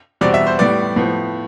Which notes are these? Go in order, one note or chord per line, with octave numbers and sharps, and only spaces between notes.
E2 B2 G3 C4 D5
E5
C5
A2 G3 B3 D5
A2 F3 B3